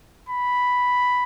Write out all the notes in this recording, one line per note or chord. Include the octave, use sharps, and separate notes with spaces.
B5